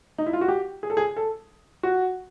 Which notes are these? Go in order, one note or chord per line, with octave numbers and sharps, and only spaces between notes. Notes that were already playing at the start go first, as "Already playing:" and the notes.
D#4
E4
F4
F#4
G4
G#4
A4
G#4
A4
F#4